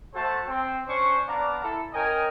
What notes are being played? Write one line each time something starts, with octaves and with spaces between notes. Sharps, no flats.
A3 F#4 A4 C5 A5
C4
C#4 D4 C5 C#6
B3 D4 D5 F5 A#5
E4 A4
C#4 A#4 D#5 G5 G#5